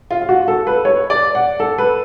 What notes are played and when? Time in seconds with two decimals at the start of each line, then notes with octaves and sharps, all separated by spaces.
0.11 F4
0.21 F4
0.29 F#4
0.48 A4
0.67 B4
0.85 C#5
1.10 D5
1.35 F#5
1.60 A4
1.78 B4